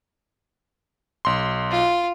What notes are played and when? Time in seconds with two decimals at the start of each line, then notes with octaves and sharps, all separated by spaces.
1.25 B1 C6
1.71 F4